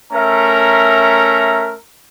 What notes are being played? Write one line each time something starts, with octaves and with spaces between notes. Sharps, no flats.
A3 C#4 A#4 E5 A#5